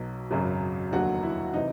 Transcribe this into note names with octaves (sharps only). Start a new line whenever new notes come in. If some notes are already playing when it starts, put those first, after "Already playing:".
Already playing: B1 B2 F#3
G#1 F#2 C#3 F#3
F1 D#2 D3 F#3 F#4
E4
C3 E3 D#4